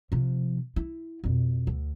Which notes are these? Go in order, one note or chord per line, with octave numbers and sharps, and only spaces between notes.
C3 F3
E4
F2 B2
D2